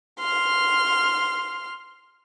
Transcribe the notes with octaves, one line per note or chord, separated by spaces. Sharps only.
C6 F6